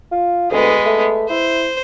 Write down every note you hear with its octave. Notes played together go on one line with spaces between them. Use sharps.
F4
D2 G#3 B3
A3
E4 C5